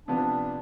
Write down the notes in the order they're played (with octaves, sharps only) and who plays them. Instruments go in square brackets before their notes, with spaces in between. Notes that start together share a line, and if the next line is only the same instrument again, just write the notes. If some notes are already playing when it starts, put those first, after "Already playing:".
[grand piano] C3 F3 B3 [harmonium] D4